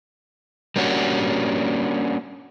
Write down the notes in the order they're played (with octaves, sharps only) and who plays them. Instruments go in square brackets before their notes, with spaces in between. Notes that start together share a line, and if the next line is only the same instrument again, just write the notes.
[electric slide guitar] G3 A#3 C#4 D4 F#4